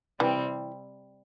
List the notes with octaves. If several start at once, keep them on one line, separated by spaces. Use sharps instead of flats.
C3 E3 G3 C4